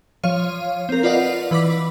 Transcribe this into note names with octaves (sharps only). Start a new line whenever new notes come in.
F3 C#5 F5 D#7
C4 A#4
F4 B4 D5 D#5 F5 F#5
E3 B4 B5 D6 B6